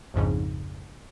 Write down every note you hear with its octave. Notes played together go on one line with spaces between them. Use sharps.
A#1 F2 G#2 C#3